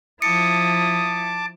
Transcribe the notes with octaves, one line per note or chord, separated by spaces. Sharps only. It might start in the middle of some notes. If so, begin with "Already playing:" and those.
F3 E4 A5 D6 D#6 C#7